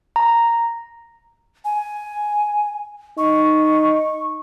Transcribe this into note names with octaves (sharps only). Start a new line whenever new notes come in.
A#5
G#5
D#4 C#6